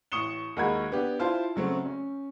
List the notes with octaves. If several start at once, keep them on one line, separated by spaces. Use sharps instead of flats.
A1 C#6 D#6 C#7 E7 G7
D#2 G#3 F#4 A#4 B5 G#6
B3 D4 G4
E4 F4 C5 A5
C#3 F#3 A3 C4
C#4